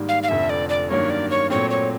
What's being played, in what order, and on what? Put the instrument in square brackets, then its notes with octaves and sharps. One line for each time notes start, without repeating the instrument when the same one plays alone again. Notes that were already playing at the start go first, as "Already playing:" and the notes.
Already playing: [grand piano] G#2 D#3 G3 A#3
[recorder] F5
F5
[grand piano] F1 F2 D3 [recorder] E5
[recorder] D5
D5
[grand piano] G2 D#3 F#3 A#3 C#4 [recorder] C#5
[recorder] D5
C#5
[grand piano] A#2 F#3 A3 C4 [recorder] C#5
[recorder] C#5